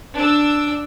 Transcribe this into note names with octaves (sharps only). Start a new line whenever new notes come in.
D4 E6